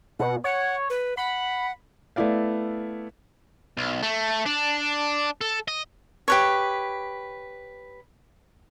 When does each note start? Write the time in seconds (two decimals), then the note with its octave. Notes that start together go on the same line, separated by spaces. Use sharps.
0.19 B2 F#5
0.44 C#5 F#5
0.90 B4
1.17 F#5 B5
2.16 A3 B3 E4 D5 F5
3.78 B1
4.03 A3
4.46 D4
5.41 A4
5.68 D#5
6.28 G4 B4 C#5